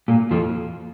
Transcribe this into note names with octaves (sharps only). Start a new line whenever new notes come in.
A#2
F2 F3